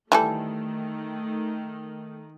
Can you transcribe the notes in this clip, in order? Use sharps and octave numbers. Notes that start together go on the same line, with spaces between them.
D#3 E3 G3 A3 A4